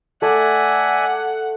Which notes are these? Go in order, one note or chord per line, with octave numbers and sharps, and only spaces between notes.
A3 D5 E5 F#5 G#5